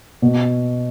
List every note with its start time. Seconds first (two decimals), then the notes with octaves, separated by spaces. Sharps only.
0.22 B2